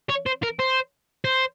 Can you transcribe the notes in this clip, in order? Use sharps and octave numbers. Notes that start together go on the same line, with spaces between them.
C#5
C5
A#4
C5
C5